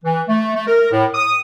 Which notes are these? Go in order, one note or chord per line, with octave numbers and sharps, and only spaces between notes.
E3
A3
A3
A#4
A2
D#6